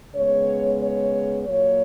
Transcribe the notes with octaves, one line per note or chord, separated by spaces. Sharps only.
C#3 G#3 B3 C#5
C#5
A#2 F#3 A#3 C#5